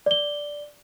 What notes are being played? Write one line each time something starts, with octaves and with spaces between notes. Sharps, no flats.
D5 G7